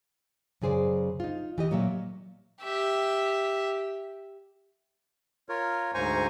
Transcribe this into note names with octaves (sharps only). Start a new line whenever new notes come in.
F#2 C#3 G#4 C5 D5
D#4 F4
E3 G4 D#5
A#2 F#3 A#3 C#5 E5
G4 E5
F4 A#4 C#5
D2 G#2 C5 G#5 A#5 C#6